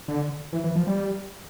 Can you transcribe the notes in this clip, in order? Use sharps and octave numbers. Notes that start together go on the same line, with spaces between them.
D3
E3
E3
F3
G3